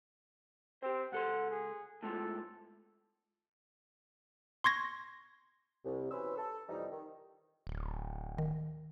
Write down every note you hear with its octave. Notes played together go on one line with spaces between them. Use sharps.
C4 G4 C5
C#2 A4 F#5 C6
G#4
A2 G#3 F4 A4
C6 C#6 G#6 A#6
C2
B2 E3 C#4 B4 C5 E6
A4
F2 C3 E3 G3 D#4
D#3
D1
D#3